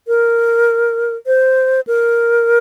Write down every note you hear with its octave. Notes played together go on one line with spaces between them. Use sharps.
A#4
C5
A#4